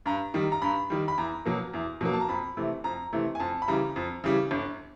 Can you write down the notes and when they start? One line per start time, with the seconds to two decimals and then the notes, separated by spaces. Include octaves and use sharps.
0.06 G2 A#5
0.34 D#3 G3
0.52 A#5
0.62 G2 B5
0.90 D#3 G3
1.08 B5
1.18 E2 A#5
1.46 B2 F#3 A#3
1.73 E2
2.01 B2 F#3 A#3
2.13 A5
2.21 A#5
2.29 F2 B5
2.57 C3 E3 A3
2.84 F2 A#5
3.13 C3 E3 A3
3.35 G#5
3.40 F2 A5
3.62 B5
3.68 C#3 E3 G3 A#5
3.96 F2
4.24 C#3 E3 G3
4.51 G1